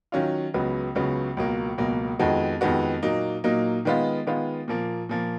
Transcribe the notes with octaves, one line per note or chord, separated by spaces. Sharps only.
D#3 F#3 C#4 F4
C#2 C#3 F#3 B3
C#2 C#3 F#3 B3
C#2 B2 F#3 A#3
C#2 B2 F#3 A#3
F2 D#3 G#3 B3 F#4
F2 D#3 G#3 B3 F#4
A#2 F#3 A#3 D#4
A#2 F#3 A#3 D#4
D#3 G#3 B3 F4
D#3 G#3 B3 F4
A#2 F3 A#3
A#2 F3 A#3